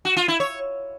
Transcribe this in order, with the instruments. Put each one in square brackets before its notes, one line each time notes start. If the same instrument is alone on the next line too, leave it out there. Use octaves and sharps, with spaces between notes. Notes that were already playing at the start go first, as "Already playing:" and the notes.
[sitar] F#4
F4
E4
C#5